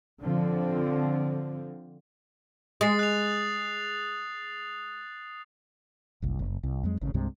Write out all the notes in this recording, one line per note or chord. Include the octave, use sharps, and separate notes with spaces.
D3 F3 C4
G#3 D#6 A6 C7
F#6 F7
F#1 C2
F#1
C2
F2 F#3 G#3
G#1 A2 C#3
C2 G2 C3 G#3